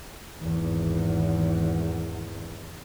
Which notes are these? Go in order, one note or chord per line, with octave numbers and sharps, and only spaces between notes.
G#1 E2